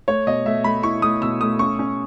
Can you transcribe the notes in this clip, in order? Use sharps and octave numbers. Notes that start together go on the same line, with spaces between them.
A3 C#5
B2 D#5
A3 E5
A3 B5
E4 C#6
A3 D#6
B2 E6
A3 D#6
C#4 C#6
C#4